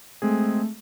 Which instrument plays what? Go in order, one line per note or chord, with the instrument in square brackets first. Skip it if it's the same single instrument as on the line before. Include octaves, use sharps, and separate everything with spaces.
[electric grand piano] G#3 C4 G#4 [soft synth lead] A3